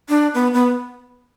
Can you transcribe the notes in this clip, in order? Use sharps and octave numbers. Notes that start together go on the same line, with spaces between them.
D4
B3
B3